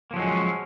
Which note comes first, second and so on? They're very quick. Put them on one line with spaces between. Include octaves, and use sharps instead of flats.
A#3 F3 F#3 G#3 C#4